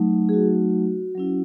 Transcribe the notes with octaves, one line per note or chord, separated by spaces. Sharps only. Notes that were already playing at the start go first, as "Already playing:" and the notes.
Already playing: F#3 A3 D#4
G#4
F#4
F#3 C#4 E4